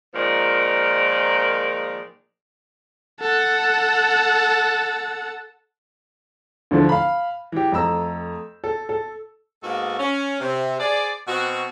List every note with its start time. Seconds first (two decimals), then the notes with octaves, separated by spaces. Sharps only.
0.15 A#2 D#3 F3 G#3 A#4 D5
3.21 A4 F#5
6.71 D2 D3 E3 F3 A3
6.89 F5 B5
7.52 E3 G4
7.72 F2 A3 A#5 E6
8.64 A4
8.89 A4
9.63 G#2 A#3 B3 F#4 A4
9.99 C#4
10.40 C3
10.80 G#4 C5 D5
11.27 B2 C4 F#4